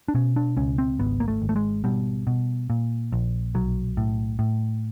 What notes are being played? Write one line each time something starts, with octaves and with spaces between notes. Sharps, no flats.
D4
B2 C#4
D4
C#2 C#4
C4
G#1 B3
A#3
A3
G#1
A3
G#3
B2 G3
B2
A#2
A#1
B1 F#3
A2
A2